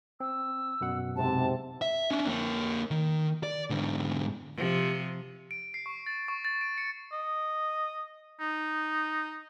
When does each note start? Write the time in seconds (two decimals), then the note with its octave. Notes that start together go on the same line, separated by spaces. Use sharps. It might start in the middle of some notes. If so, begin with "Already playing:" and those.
0.20 C4 E6
0.81 F#2 B2 F#5
1.16 G#2 C3 A5
1.82 E5
2.11 C#4 D4
2.27 A#3 C#5
2.91 D#3
3.43 D5
3.70 G#2 D3
4.55 C3 F3
5.51 D7
5.74 C7
5.86 C#6
6.06 A6
6.28 C#6
6.45 A6
6.61 D7
6.78 C#7
7.12 D#5
8.40 D#4